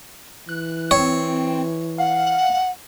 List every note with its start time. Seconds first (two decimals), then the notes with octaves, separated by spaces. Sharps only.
0.49 E3 F#6
0.91 C4 C#5
1.98 F5 F#5